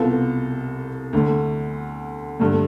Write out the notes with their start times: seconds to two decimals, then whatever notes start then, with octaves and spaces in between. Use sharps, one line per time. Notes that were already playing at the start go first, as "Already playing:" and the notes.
Already playing: C2 B2 B3 F4 A4
1.13 D2 D3 A3
2.39 G2 D3 A3